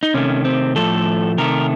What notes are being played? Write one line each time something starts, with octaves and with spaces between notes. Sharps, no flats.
D#4
C3 D#3 A3 C#4
C4
A2 F3 A3 A4
C3 D#3 A3 A#4